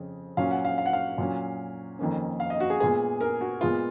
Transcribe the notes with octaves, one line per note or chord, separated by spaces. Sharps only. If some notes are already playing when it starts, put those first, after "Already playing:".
Already playing: F2 C#3
A#2 F#3 C#4 F5
F#5
F5
F5
F#5
F5
A#2 F#3 C#4
F2 D#3 A#3 C#4
F5
D#5
F#4
G#4
A#2 G#3 B3 G#4
A#4
F#4
A#2 G#3 B3 F4